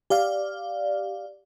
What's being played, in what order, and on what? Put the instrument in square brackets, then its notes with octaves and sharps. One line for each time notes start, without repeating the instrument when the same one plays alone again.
[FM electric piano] G4 D5 F5